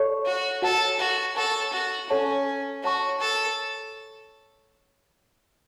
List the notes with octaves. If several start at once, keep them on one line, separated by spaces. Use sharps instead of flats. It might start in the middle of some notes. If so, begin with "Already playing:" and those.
Already playing: A4 C#5 A5 C#6
F#4
F#4 A4 C#5 F#5 A5
F#4
A4 C#5 F#5 A5 C#6
F#4
C#4 A4 C#5 F#5 A5 C#6
F#4 C#5 A5 C#6
A4